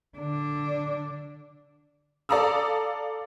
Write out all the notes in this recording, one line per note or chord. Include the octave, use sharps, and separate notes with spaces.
D3 D4
A4 D5 F5 A#5 D#6 E6